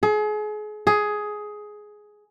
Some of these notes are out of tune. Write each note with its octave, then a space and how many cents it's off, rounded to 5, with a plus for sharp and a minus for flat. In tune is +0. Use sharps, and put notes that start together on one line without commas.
G#4 +35
G#4 +10